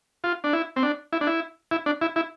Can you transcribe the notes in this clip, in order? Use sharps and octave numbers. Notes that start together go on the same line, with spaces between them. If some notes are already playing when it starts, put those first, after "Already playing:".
F4
D4
E4
C4
D4
E4
D4
E4
E4
D4
E4
E4